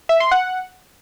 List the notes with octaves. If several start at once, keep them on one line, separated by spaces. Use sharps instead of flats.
E5
C6
F#5